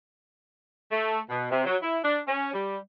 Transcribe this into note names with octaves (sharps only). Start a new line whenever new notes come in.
A3
B2
C3
F#3
E4
D4
C#4
G3